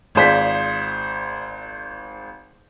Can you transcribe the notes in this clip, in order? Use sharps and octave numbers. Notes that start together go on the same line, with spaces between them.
G#1 F4 G#4 C5 D5 B6